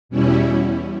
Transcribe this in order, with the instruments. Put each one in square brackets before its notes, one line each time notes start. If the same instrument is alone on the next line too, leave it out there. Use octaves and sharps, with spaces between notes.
[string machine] E2 B2 G3 C#4 E4